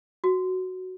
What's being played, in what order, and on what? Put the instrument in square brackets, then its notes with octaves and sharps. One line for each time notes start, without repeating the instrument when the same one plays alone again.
[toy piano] F#4